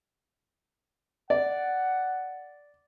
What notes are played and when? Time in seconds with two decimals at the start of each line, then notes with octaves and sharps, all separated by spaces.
1.30 D5 F#5